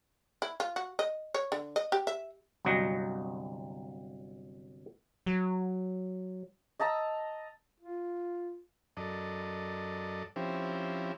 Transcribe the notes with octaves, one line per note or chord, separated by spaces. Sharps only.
E4
F4
F#4
D#5
C#5
D3
D#5
G4
E5
G1 C2 F#3 F#4 D#5 A#5
F#3
D#5 A5 A#5 E6
F4
F#2 A4 D5 D#5
F3 C4 C#4 E4 G4